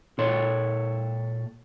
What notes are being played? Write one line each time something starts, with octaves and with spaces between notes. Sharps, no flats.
A#2 A4 C#5 C6